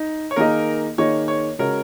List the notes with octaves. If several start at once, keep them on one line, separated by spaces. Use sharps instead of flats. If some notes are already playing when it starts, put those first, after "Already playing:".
Already playing: D#4
C#5
D#3 A#3 D#4 G#4 A#4 D#5
D#3 A#3 D#4 G#4 C#5 D#5
C#5
C#3 G#3 F#4 A#4 C#5